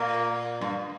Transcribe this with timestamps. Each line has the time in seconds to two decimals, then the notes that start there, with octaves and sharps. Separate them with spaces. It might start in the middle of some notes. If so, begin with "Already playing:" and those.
Already playing: A#2 A#3
0.61 G2